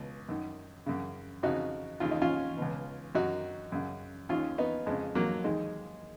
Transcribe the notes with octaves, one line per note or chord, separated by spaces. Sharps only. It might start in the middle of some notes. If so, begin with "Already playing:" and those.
Already playing: C#2 B2
F#2 D#3
F#2 C#3
F2 C#3 D#4 F#4
D#2 C#3 F4
D#4
C#4 F4
C#2 B2
F#2 D#3 D#4 F#4
F#2 C#3
D#2 D#3 C#4 F4
B3 D#4
F2 C#3 G#3
F#3 A#3
D#2 D#3 G#3